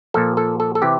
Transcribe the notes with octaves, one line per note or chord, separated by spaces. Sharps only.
A#2 F3 A4
A4
A4
A4
C3 E3 G4